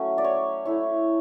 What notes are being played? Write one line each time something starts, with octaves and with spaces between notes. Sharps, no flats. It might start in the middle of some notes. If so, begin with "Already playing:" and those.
Already playing: F#3 A3 C#4
D5
C#5
A3 E4 C#5